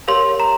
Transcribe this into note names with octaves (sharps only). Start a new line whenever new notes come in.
G4 A#4 C#5 F5 C6
A#5